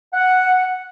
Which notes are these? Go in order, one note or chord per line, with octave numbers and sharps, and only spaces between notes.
F#5